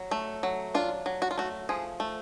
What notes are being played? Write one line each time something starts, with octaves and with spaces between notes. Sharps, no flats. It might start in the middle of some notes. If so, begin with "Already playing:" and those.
Already playing: F#3
A3
F#3
D4 F4
F#3
F#4
F4
A3 F#4
F3 G#4
A3